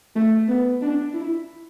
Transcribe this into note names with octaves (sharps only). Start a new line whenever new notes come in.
A3
B3
D4
E4